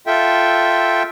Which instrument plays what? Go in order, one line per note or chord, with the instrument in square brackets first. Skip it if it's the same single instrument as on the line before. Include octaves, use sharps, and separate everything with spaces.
[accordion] F4 A4 E5 G5